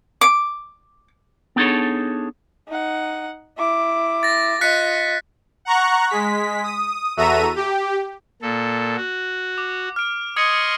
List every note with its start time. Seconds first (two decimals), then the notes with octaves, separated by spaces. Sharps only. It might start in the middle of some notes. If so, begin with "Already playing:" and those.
0.21 D6
1.56 B3 D4 D#4 G#4 A4 C#5
2.68 D#4 F#5
3.57 E4 D6
4.23 A6 A#6
4.61 F4 D#5 F#6 B6 C#7
5.65 F#5 A#5 C#6 F#6
6.10 G#3 B6
6.63 D#6
7.17 E2 F#4 A4 E5 A#5 D#7
7.56 G4
8.42 A#2 A4
8.97 F#4
9.58 D6
9.96 F6 D7
10.36 D#5 C6 C#6 D#6 G#6 C#7